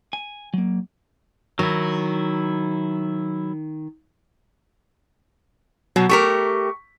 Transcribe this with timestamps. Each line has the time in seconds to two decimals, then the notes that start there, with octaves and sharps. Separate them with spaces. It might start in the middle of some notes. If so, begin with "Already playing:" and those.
0.13 G#5
0.54 F#3 A#3
1.59 D#3 F#3 E4
5.96 B2 F#3
6.09 A3 G4 A#4 C#6 B6